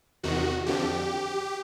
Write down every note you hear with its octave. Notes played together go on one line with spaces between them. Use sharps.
E2 C3 D#3 F#4
F2 D3 F3 G4